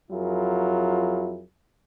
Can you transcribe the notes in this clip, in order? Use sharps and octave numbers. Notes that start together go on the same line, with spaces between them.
F2 F#3 E4 F4 G#4 A#4